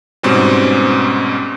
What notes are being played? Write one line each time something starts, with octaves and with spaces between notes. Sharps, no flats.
G#2 B2 G3 C4 C#4